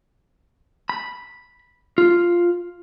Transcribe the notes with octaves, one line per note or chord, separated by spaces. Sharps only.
B5
F4